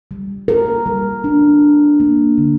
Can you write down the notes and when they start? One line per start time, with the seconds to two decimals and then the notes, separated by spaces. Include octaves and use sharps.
0.11 G3
0.48 A#4
0.86 G3
1.24 D4
1.62 D4
2.00 A#3
2.38 D3